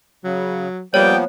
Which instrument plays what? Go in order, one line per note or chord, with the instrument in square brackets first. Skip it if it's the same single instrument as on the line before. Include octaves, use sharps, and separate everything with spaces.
[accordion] C#3 [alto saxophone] F#3
[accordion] F3 A#3 B3 [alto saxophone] G3 [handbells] C#5 [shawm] G5